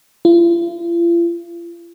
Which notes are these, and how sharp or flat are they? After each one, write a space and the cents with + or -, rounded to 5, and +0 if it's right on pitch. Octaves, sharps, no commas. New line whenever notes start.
F4 -45